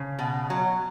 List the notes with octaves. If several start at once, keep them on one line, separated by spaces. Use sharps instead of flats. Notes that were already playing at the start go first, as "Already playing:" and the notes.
Already playing: C#3
B2
F#3